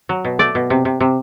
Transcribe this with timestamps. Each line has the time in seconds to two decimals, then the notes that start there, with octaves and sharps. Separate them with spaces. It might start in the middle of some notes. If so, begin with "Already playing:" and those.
0.09 F#3
0.25 B2
0.39 A3 D5
0.55 B2
0.70 C3
0.85 C3
1.00 C3